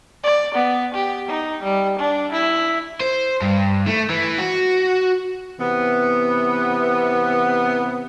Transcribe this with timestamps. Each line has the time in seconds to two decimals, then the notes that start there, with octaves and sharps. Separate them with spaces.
0.24 D5
0.55 B3
0.94 G4
1.29 D#4
1.63 G3
1.99 D4
2.32 E4
3.00 C5
3.41 G2
3.87 A3
4.10 E3
4.39 F#4
5.60 C3 E3 B3